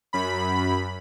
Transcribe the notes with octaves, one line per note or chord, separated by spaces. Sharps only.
F#2 B5